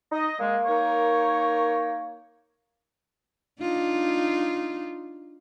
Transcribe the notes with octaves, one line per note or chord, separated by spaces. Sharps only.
D#4 D#5
G#3 A#3
D#4 A#4 C#5
D4 D#4 F4